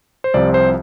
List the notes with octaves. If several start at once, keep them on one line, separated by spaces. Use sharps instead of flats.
C5
C2 C3 F3 C4 F4 D5
C5